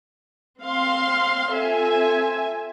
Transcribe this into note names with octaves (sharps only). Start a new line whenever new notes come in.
C4 F5 C6
C4 F4 A4 E5 G#5